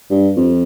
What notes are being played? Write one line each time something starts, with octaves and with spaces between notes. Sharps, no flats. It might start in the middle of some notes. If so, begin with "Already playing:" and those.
G2
F2